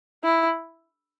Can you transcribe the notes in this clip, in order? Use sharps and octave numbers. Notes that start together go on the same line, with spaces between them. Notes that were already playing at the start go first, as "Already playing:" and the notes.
E4